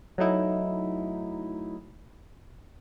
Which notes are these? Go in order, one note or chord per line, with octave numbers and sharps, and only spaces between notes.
F#3 A3 D#4 E4